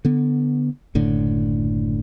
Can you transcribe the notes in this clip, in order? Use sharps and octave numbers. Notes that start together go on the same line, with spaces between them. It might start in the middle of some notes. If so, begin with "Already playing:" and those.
D3 B3
F#1 A2 D3